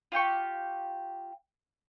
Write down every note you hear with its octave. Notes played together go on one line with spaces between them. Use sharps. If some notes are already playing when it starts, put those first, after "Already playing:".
F4 G4 G5 C#6